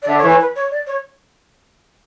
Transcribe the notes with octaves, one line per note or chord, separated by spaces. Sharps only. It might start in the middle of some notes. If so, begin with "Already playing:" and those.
D5
D3 E5
C#5
E3
C#5
B4
C#5
D5
C#5